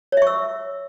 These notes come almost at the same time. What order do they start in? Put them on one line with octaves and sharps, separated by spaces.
C#5 E5 C#6 E6